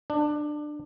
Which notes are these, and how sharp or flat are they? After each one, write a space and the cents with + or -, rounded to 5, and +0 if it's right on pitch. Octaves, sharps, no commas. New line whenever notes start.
D4 +20